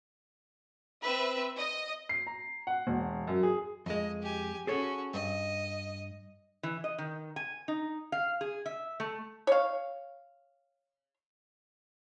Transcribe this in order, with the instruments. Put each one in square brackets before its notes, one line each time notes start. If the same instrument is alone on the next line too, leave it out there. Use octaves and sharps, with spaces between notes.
[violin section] C4 B4 E5
D#5
[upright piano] C7
A#5
F#5
E1
F#2
G#4
[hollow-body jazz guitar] F2 G#3 [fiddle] D#5
[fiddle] G4 G#5
[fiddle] C#4 F#4 [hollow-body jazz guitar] G#4 A4 C#5
[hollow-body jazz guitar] G2 [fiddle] D#5
[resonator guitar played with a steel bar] E3
D#5
D#3
G#5
D#4
F5
G#4
E5
A3
[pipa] C#5 F5